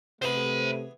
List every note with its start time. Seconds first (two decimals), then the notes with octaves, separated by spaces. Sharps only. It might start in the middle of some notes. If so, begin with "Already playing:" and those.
0.22 C3 E3 A3 B3 G#4 C5 B5